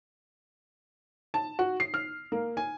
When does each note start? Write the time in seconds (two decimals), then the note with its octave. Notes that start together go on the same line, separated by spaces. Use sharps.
1.34 A5
1.59 F#4
1.80 C7
1.94 F6
2.32 A#3
2.57 G#5